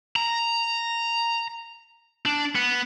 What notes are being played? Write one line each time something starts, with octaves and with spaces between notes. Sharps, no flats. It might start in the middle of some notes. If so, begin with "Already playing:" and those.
A#5
D4
B3